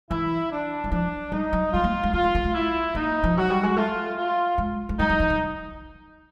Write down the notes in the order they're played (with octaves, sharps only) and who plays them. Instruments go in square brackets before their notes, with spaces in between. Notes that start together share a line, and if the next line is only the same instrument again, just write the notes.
[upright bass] E3 [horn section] E4
[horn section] D4
[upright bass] F#3
[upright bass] F3 [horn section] D4
[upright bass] G3 [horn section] D#4
[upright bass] F#3
[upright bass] G3 [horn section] F4
[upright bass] A#3
G#3
[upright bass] A3 [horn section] F4
[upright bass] A3
A#3
A3
[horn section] E4
[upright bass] A#3 [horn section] D#4
[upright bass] F3
[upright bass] F#3 [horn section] F#4
[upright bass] G3
G#3
[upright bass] A3 [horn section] F4
[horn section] F4
[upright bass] G#3
G#3
[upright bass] G3 [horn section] D#4
[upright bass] F#3
E3
D#3